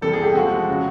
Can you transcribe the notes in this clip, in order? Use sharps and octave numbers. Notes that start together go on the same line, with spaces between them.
C3 E3 G3 A4
G#4
G4
C3 F3 G#3 F#4
C#3 F#3